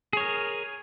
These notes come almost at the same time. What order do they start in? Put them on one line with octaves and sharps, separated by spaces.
G#4 C#5 A#4